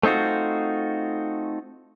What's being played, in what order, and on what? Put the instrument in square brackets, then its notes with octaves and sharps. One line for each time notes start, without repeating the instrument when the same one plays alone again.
[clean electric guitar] A3 C4 D#4 F4 F#4